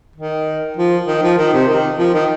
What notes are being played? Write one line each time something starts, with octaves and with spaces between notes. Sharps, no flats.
D#3
F3
D#3
F3
D#3
C3
D#3
F3
D#3